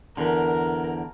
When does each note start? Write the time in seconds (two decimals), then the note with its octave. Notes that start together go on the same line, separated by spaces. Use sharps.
0.17 E2 D3 A#4